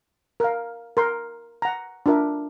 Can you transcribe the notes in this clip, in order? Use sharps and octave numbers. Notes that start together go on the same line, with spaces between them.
A#4 F5
A#4 C6
F#5 A#5
D4 F4 A#4 E5